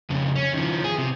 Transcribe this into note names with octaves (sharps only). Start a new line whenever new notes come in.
F2 C#3
C#4
D#3 F3
G#4
C3